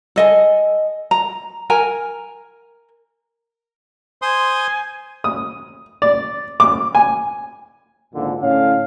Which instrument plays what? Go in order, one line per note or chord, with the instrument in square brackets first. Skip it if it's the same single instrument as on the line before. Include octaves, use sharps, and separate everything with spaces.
[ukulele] A4 D#5 G#5
A#5
A#4 G#5 A#5
[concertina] C5 C6 D#6 [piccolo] G#5
[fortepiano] D#6
D5
D6
G#5
[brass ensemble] G#1 F2 A#2 D3
A2 D3 C#4 F5